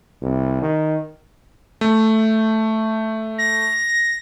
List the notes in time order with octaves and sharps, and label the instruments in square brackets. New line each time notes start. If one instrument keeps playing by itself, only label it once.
[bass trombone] C2
D#3
[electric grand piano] A3
[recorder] A#6